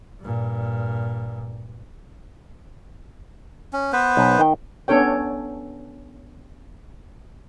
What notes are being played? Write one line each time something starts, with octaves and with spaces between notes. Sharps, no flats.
G2 A#2
C#4
B3 B4 C5
B1
D#3 G5
B3 C#4 D4 A4 C#5 G5